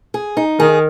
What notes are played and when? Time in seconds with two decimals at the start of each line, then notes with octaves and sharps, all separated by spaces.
0.14 G#4
0.37 D#4
0.59 D#3 G#4